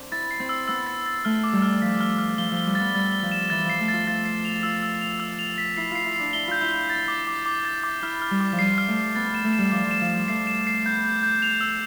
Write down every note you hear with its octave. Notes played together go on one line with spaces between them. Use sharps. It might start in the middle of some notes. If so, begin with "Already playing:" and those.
Already playing: C4 D4
E4 A6
C7
C4
E6
B3 E6
A6
A6
A3 F6
D6
G3
F6
F3 B6
F6
F6
F3 G7
F3
G7
G3
B3 A6
G3 A6
G7
F3
E7
E3 A6
F3 C7
A3
F4 A6
F4 A6
C7
F7
F4 E6
E6
F7
E6
F7
B6
E4 C7
F4 C7
E4
C7
D4
E4 G7
F4 G6
E4
G7
A6
D6
D6
D6
A6
D6
E4 F6
F6
G3
D6
F3
G3 C7
F6
A3
C7
B3 A6
B3 E7
A3
E7
G3
F3 D6
F3
E7
F3
G3 E7
A3 C7
E7
C7
B3 G6
G6
G6
F7
E6